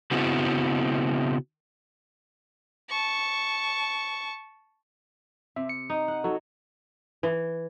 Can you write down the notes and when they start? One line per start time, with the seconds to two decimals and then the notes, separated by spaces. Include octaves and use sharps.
0.11 C#3 B3 C4 E4 F#4
2.89 A5 C#6
5.56 C3 E5
5.69 C#7
5.90 D#4
6.08 F#5
6.24 F#3 D#4 F#4 A4
7.23 E3